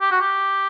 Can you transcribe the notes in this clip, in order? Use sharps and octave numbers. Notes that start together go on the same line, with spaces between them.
G4
F#4
G4